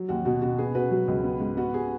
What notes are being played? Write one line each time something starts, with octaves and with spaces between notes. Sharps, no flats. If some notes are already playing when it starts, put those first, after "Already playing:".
Already playing: F#3
D#2 F#4
B2 F#4
B2 F#4
B3 G#4
B2 F#4 B4
F#3
C#2
B3
G#2
B3 F#4
G#4